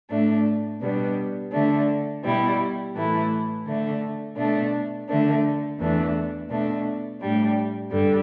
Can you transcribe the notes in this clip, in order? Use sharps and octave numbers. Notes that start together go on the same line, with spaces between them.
A2 A3 D4
B2 G3 B3 D4
D3 A3 D4
B2 G3 E4
A2 E3 A3 E4
D3 A3 D4
B2 A3 D4
D3 A3 D4
E2 E3 A3 D4
B2 A3 D4
A2 G3 D4
G2 D3 G3